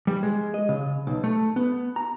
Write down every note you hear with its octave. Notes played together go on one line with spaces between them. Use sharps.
G3
G#3
D#5
C#3
B1
A3
B3
A#5